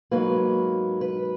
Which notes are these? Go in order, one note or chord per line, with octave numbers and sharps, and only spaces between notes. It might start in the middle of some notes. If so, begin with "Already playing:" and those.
G#2 F#3 A#3 B4
B4